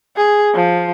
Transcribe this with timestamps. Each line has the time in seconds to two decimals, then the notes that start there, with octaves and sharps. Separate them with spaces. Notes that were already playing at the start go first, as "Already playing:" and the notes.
0.17 G#4
0.54 F3